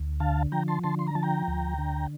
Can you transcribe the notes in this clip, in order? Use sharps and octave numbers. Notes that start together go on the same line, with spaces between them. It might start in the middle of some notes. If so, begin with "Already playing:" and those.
Already playing: D2
D3 F5 A5
F3 G5 A#5
A5 C6
D3 A5 C6
C6
A#5
F3 A5
G5 A#5
D2
D3